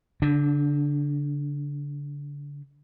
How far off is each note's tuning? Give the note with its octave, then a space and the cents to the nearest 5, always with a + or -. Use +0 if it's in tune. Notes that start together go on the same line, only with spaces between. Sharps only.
D3 -40 D4 +0